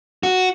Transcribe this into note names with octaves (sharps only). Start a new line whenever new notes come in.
F#4